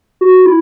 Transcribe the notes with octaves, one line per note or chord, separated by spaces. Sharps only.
F#4
E4